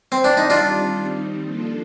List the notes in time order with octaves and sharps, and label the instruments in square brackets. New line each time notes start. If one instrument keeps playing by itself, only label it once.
[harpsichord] C4
D4
D#4
[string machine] D#3 G3 C4 D#4 [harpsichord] D4 F4
[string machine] F3 A#3 D4 F4 A4